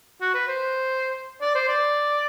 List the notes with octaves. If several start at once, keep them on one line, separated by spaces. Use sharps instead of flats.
F#4
B4
C5
D5
C5
D5